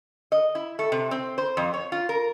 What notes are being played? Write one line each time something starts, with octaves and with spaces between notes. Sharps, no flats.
D#5
E4
A3
C3
C4
C5
F2
C#5
F4
A#4